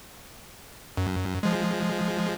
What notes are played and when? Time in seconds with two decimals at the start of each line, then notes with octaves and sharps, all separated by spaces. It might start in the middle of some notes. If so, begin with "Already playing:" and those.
0.97 F#2
1.43 F3 G#3